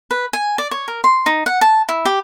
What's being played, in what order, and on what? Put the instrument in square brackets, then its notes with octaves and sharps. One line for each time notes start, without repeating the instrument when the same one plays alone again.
[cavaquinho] B4
G#5
D5
C#5
A#4
C6
D#4
F#5
A5
E4
G4